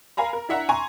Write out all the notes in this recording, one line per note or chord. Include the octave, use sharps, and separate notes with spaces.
A#4 F5 G#5 A#5 B5
A#4
D4 E4 E5 F#5 A#5
G#5 A#5 C6 C#6